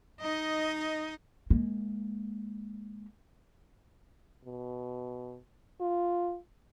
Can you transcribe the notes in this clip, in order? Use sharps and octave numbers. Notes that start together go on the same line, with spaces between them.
D#4 D#5
G#3 A#3
B2
F4